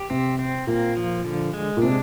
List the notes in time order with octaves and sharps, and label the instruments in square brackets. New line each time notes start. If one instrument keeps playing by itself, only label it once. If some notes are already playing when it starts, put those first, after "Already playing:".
Already playing: [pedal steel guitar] G4
[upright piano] C3 [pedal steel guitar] C4
[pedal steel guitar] C4
[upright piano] A#2 [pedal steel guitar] A#3
[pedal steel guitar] F3
D3
G#3
[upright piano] A#2
[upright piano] C3 [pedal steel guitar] D4